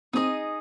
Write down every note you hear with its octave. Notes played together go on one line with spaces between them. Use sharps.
C4 D#4 G#4 D#5